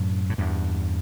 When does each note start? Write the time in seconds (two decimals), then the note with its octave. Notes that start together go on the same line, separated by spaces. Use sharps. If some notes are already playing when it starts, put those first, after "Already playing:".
Already playing: F#2 A2
0.29 A2
0.38 E2 G2